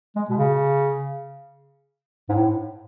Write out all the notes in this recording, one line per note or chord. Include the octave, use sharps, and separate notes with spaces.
G#3
B2
C#3
G#2
A2